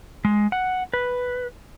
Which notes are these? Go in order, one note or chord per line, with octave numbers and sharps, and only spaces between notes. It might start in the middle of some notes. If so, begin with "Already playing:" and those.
G#3
F#5
B4